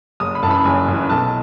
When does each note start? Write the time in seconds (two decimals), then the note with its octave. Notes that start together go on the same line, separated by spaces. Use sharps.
0.20 F#1 D#6
0.35 B5
0.43 F#2 A5
0.47 E3 B5
0.65 F#1 G#5
0.88 F#2 E3
1.09 B1 A5